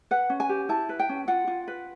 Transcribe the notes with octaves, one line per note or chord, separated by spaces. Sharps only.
B4 F#5
C#4
G#5
G4
E4 A5
B4
G5
C#4
F4 F#5
F4
B4